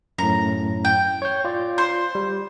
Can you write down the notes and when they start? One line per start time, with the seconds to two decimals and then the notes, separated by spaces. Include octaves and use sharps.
0.18 F#2 A2 A#5
0.85 G5
1.22 C#5 G6
1.45 F4 D5
1.78 C5
2.15 G3